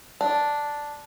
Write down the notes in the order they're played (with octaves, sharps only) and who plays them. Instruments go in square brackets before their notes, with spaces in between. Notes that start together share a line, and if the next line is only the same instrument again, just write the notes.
[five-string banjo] D4